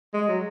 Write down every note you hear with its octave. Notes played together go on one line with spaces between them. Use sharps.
G#3
F#3